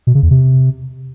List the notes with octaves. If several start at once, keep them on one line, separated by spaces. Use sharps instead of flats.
B2
C#3
E2
C3